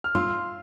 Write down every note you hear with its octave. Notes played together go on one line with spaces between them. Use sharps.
F6
F4 C6 E6